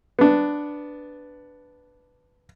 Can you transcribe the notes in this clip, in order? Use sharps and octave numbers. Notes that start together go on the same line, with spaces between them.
B3 D4